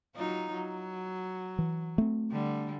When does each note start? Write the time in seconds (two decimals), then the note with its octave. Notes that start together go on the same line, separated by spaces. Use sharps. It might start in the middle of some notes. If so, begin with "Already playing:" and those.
0.15 F#3 D#4 F4
0.52 F#3
1.59 E3
1.98 A3 C4
2.31 D3 G3